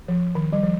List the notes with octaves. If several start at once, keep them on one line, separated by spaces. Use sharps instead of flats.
F3
D#3
G3
F3